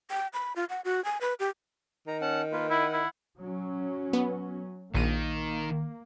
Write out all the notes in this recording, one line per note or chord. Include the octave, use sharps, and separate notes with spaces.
G5
B5
F4
F#5
F#4
G#5
B4
G4
D#3 A#5
C#4 F#5 A5
A#3 F4 B4
E4 F#5
E4
F#3 C#4
B3
A#1 D#3 A#3 D#7